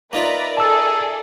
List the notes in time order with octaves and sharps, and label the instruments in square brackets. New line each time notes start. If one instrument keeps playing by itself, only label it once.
[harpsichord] A#3 D#4 F4 [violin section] A#4 D5 E5 [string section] B4 A#5
[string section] G#4 A4 [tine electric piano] A5 E6